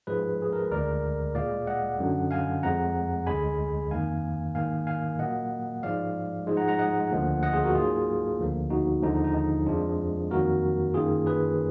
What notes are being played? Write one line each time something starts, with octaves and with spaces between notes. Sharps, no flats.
G#2 F3 G#3 G#4 B4
G#4
A#4
B4
D2 D3 G#3 A#4 D5
A#2 G#3 D5 F5
D#5 F#5
F#2 D3 F#3
F5 G#5
F2 F3 G#3 F#5 A#5
D2 D3 G#3 G#5 B5
F2 D#3 A#3 F5 G#5
G#2 D#3 A#3 F5 G#5
F5 G#5
A#2 F#3 A#3 D#5 F#5
G#2 F3 G#3 D5 F5
G#2 F3 G#3
F#5 A#5
F#5 A#5
D#5 F#5
D2 D3 F3 A#3
D#5 F#5
F4 G#4
F#4 A#4
G#2 F#3 A#3 F4 G#4
D2 D3 F3 A#3
D#4 F#4
D#2 D3 F3 G#3 D#4
D#4
D#4
D#4
F2 F3 G#3 D4 F4
F2 D#3 F#3 A#3 F#4 A#4
F#2 D#3 A#3 F4 G#4
G#4 B4